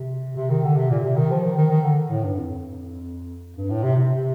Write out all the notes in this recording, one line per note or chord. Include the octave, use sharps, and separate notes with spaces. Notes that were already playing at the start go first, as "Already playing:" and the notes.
Already playing: C3
C3
D#3
D3
C3
A#2
C3
D#3
F3
D#3
D#3
D#3
D3
A2
G2
F2
G2
A2
C3
C3